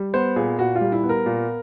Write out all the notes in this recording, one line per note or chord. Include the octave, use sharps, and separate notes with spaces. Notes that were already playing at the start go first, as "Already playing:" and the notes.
Already playing: G3
B3 C5
A#2 G#4
A#2 F#4
F4
G3
E4
B3
A#4
A#2